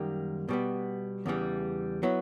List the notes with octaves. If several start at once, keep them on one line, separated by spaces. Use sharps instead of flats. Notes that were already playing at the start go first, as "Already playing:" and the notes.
Already playing: F#2 D#3 G3 A#3
B2 G3 B3
E2 C#3 E3 G3
F#3 B3 E4